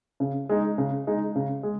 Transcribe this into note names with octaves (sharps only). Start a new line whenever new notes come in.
C#3
G#3 D#4
C#3
G#3 D#4
C#3
G#3